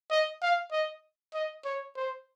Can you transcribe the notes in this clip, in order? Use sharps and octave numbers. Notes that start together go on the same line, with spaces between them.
D#5
F5
D#5
D#5
C#5
C5